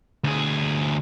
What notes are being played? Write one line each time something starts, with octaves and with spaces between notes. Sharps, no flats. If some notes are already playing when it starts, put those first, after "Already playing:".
D2 G#4